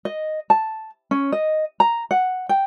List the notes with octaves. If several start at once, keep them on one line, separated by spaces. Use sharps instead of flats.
D#5
A5
C#4
D#5
A#5
F#5
G5